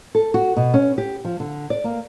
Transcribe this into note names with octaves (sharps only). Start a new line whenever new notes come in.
A4
F#4
B2
C#4
G4
F3
D3
D5
A#3